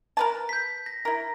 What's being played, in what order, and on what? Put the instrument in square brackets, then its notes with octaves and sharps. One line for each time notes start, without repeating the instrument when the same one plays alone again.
[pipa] A#4 B4 A5
[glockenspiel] G6 B6
A#6
[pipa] E4 A#4